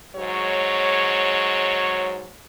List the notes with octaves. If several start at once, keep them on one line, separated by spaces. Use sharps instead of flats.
G#2 F#3 G#3 C#5